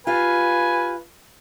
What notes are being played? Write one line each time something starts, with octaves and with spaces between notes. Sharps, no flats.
F4 G4 B4 F5 G#5